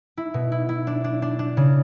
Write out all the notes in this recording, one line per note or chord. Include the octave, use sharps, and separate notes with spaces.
E4
B2
E4
E4
D4
D4
D4
D4
C#3